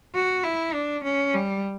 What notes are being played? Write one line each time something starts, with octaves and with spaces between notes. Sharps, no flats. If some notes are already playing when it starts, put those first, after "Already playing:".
F#4
E4
D4
C#4
G3